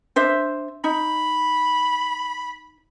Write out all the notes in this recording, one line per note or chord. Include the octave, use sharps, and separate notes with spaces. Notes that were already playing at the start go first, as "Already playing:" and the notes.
D4 C5 E5
D#4 B5